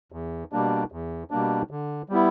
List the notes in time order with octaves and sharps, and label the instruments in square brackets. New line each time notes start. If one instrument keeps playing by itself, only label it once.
[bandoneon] E2
B2 G3 A#3 D4
E2
B2 G3 A#3 D4
D3
G3 B3 E4